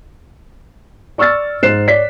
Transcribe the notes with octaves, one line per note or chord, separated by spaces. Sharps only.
D5 C#6 E6 F6 A6
G#2 C5 F#6 C7 E7
C#5 D5 B6